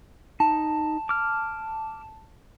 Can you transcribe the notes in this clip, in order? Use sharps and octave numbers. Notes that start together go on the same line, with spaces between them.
D#4 A5
D6 F6